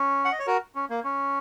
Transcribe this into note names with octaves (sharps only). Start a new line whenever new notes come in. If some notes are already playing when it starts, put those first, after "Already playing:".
Already playing: C#4
F#5
D#5
C#5
F#4 A#4
C#4
A#3
C#4